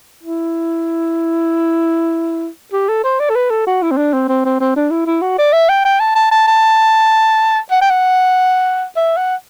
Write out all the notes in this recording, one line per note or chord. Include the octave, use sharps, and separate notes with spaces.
E4
G4
A4
C5
D5
A4
B4
A4
F#4
E4
C4
D4
C4
C4
C4
C4
D4
E4
E4
F#4
D5
E5
G5
G5
A5
A5
A5
A5
F#5
G5
F#5
E5
F#5